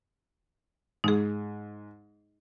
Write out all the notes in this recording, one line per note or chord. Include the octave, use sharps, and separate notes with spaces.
G#2 D#4 G#4